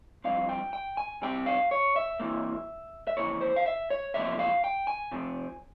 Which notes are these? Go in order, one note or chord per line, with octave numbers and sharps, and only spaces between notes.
G2 F3 C4 F5
G5
G5
G#5
C3 G3 C4 G5
F5
C#5
E5
C3 E3 A#3
E5
F2 C#3 E3 A#3 C#5
C5
F5
E5
C#5
E2 C3 F3 A#3 E5
F5
G5
G#5
C3 F3 C4